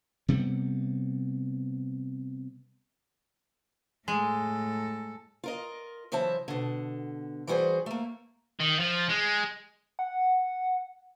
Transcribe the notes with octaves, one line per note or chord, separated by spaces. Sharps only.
C3 G3 B3
A2 G#3 A4
F4 A#4 D#5
C#3 E3 F#3 C5 E5 A5
B2 D3
E3 G3 F#4 G#4 C5
A3 A#3
D#3
F3
G#3
F#5